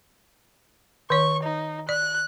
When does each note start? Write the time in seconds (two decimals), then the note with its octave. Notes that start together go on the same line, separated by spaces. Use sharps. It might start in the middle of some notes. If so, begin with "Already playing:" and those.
1.10 D#3 C#5 C#6
1.43 D#4
1.89 D5 F#6